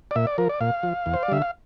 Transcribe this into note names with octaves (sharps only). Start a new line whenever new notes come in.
D5
A#2 E5
D5
F3 A#4
D5
A#2 F5
F3
E2
C5
D5
D3 G3 E5
F5